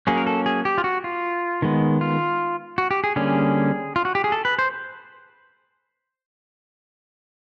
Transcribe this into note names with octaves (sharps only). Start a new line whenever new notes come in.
F#3 A#3 C#4 G#4
A#4
A4
G#4
G4
F4
F#4
F4
D#3 G#3 B3
F4
F#4
G4
G#4
D3 G3 A#3 C#4 G#4
F4
F#4
G4
G#4
A4
B4
C5